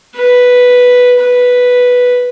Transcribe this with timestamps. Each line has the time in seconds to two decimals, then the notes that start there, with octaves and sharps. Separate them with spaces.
0.15 B4
1.19 B4